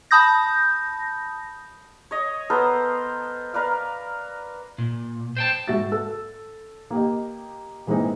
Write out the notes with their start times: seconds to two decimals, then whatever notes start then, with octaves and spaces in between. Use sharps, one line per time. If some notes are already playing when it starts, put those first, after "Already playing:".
0.11 A5 B5 D#6 G6 A#6
2.11 C#5 D#5
2.50 B3 A4 A#4 C5
3.53 A#4 B4 D5 F5
4.78 A#2
5.37 C5 G5 A5
5.68 G#2 F#4 E5 A6
5.92 A4 E6
6.91 A#3 G4 D#5
7.87 E3 G#3 A#3 C4 D#4